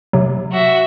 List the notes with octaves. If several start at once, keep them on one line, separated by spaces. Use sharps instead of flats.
C3 F#3
F#4 E5